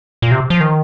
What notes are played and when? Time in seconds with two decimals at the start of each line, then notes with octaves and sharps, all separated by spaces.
0.22 A#2
0.31 C3
0.50 F3
0.61 D#3